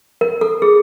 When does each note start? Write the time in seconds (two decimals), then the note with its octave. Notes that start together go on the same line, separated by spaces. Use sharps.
0.21 A#4
0.41 A4
0.62 G#4